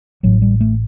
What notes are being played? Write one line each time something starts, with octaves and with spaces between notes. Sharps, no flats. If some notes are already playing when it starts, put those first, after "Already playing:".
A1 A2 F#3
G3
A3